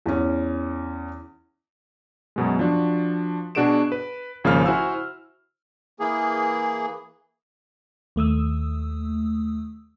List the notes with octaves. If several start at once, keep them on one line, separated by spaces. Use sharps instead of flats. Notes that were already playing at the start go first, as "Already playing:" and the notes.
E2 C#4
F#2 B2 G#3
F3 D4 F#4
B2 D4 F#4 G#4 D7 E7
B4
G#1 C#3 F3 A#3 F5 F6
E4 F#4 C5 G#5 E6
E3 A#3 G#4
D#2 A3 D#6 E6